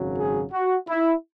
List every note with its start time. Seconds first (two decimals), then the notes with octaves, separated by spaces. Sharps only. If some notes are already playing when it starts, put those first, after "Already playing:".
Already playing: G#1 F#2 C#3 F#3
0.17 G#4
0.52 F#4
0.87 E4